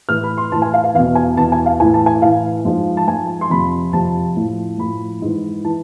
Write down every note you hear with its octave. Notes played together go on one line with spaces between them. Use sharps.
A2 E3 F6
B5
C6
A2 E3 A5
G#5
F5
F5
E2 B2 F5
G#5
E2 B2 A5
G#5
F5
A2 E3 G#5
A5
G#5
A2 E3 F5
G#2 F3
A5
G#2 F3 G#5
C6
F2 C3 F3 B5
F2 C3 F3 A5
A2 F3
A2 F3 B5
G#2 E3
E3 A5